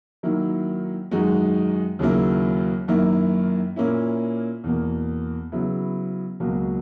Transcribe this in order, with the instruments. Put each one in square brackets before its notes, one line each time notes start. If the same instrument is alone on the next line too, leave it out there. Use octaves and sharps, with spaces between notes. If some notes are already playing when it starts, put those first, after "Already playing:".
[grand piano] D#3 F#3 A#3 E4
F#2 D#3 G#3 D#4 F#4
D#2 C#3 F#3 A#3 E4
F#2 D#3 A#3 E4
A#2 A#3 C#4 E4
E2 B2 A#3
C#3 F#3 B3 E4
C#2 B2 F#3 A#3